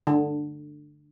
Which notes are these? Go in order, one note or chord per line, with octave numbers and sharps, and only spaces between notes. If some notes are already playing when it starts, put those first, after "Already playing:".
D3